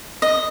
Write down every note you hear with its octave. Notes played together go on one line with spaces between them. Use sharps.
D#5